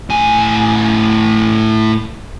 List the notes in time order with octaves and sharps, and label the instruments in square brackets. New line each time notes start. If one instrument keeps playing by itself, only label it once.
[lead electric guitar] A2 G#5